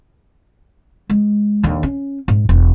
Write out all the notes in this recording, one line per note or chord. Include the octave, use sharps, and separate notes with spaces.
G#3
D#2 D3
C#4
G#2
E1